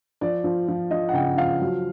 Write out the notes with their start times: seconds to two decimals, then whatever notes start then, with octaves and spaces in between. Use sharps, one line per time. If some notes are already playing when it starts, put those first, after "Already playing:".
0.21 F3 D5
0.44 F3
0.68 F3
0.91 F3 D#5
1.09 F#5
1.14 C#3 G5
1.37 F3 F5
1.61 F#3